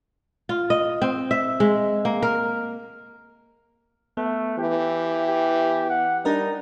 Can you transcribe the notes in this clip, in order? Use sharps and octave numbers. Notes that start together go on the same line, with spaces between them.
F4
D#5
C4
E5
G#3
A#3
A#4
A3 B3
E3 G4
G4
F#5
G3 D4 D#4 A#4 D#5